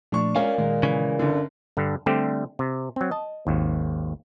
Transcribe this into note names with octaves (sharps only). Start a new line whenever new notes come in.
A#2 F3 A3 D4 C#6
G#3 C#4 A#4 D5 F5
A#2 D#3 G#3
C#3 E3
G1 D3 C#4
G2 D3
D3 G3 A3 C4 G4 C5
C3
F#3 C4
D#5 A5
G#1 D#2